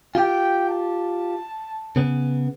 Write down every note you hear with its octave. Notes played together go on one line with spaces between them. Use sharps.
F4 G4 G5
A5
C#3 B3